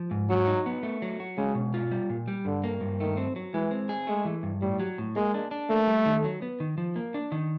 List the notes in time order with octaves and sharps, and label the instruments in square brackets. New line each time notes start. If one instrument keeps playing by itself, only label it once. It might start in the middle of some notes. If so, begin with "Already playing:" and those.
Already playing: [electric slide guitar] F3
G#2
[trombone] F#3 [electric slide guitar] F#4
[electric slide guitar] D#4
B3
A3
F#3
F#4
[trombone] C#3 [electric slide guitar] G#3
[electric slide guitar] B2
F4
G3
A#2
G3
[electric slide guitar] G2 [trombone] D3
[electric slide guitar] A#3
G2
[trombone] D#3 [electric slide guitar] A3
[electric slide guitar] C4
F#3
[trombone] E3 [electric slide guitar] G#3
[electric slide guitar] C4
G#4
[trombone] G#3 [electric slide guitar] A3
[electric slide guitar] E3
G2
[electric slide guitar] A2 [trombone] G3
[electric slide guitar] F#3
A2
[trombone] G#3 [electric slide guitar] A#3
[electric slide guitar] D4
D4
[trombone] A3 [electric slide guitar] A#3
[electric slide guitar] G3
D#3
F#3
B3
D#3
F3
A#3
D4
D#3